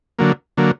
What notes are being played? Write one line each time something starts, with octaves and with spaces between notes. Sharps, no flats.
D3 F#3 A#3
D3 F#3 A#3